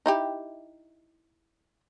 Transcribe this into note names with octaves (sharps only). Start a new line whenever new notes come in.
D#4 E4 G4